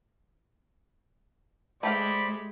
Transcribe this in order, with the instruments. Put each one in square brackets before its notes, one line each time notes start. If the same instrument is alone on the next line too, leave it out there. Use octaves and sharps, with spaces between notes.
[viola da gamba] G#3 [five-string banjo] A3 G4 F5 [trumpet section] C5 D5 B5